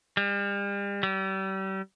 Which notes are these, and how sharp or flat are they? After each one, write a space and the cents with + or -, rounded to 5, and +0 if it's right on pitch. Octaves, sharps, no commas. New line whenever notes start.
G3 +40
G3 -35